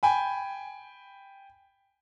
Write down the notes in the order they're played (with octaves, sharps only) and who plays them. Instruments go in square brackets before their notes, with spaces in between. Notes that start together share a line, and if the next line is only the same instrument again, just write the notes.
[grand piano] G5 G#5 B5